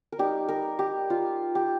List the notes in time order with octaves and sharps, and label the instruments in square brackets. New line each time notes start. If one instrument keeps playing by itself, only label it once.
[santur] A#4
G3 D#4 G4
A#4
G4
F4
G4